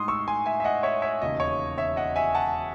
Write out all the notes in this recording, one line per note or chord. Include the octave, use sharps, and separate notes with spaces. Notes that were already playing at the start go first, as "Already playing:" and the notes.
Already playing: A2 G#3 D#4 C6 D#6
C#6 E6
G#5 C6
E5 G#5
E5
D#5 F#5
C#5 E5
C#5 E5
E1 D#2 C#3 D#5
C#5
C#5 E5
D#5 F#5
E5 G#5
F#5 A5